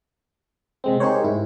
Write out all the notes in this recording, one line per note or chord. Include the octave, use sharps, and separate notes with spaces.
C3 G#3 C4
D#4 G4 G#4 A#4 C5 C#5
G#2 E4